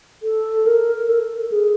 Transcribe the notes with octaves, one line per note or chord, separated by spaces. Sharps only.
A4
A#4
A4
G#4